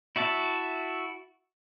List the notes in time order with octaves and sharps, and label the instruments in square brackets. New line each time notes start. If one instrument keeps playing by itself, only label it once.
[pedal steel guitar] E4 F#4 E5 A5